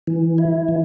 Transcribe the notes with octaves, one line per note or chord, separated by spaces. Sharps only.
E3
E4
E3